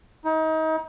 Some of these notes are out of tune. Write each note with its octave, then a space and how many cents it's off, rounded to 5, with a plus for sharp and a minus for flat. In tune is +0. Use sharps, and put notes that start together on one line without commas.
D#4 +30